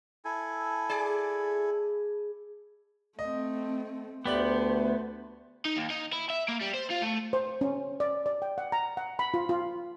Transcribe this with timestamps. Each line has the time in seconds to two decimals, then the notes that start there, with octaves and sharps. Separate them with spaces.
0.25 E4 A4 G#5
0.89 G#4 D5
3.19 A3 C4 D#5
4.26 D2 A3 B3 G4 C5 D5 F#7
5.65 D#4
5.77 D#2
5.90 D#4
6.13 E4
6.30 E5
6.48 A#3
6.61 G3
6.74 C5
6.90 F4
7.02 A3
7.33 C5
7.61 C#4
8.00 D5
8.26 D5
8.42 G5
8.58 F#5
8.72 A#5
8.97 F#5
9.19 B5
9.34 F4
9.49 F4